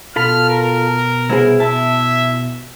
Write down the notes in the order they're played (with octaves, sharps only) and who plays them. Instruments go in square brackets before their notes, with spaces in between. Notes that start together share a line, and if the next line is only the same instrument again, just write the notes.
[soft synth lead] B2 [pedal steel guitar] F4 A4 B5 [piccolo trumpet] F6
[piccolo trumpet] A#4
[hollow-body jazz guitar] C2 B3 G#4 [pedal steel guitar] E4
[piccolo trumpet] E5 [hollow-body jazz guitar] A5